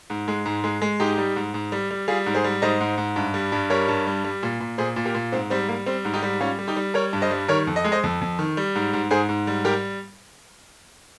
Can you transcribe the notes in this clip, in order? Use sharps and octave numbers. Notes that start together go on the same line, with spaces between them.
G#2
G#3
G#2
G#3
G#3
G#2 D#4 G4
G3
G#2
G#2
G3
G3
G3 F4 G#4
G#2
G#4 C5
G3
G#2 C5 D#5
G#2
G#2
G2
G3
G2
G3 A#4 C#5
G2
G3
G3
A#2
A#2
A#2 G#4 C5
A#2
G4 A#4
A#2
G#2 C4
G3 C4
G3 A#3
G3 C4
G#2
D#4 G4
G3
G3 C#4 F4
G3
D#4 G4
G3
G3 A#4 C#5
G2
C5 D#5
G3
D#3 A#4 C#5
F2
D#5
G#3
C5 D#5
F2
F2
D#3
G3
G#2
G#2
G#2 G#4 C5
G#2
G3
G3 G4 A#4